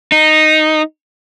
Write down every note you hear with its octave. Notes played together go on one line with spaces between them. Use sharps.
D#4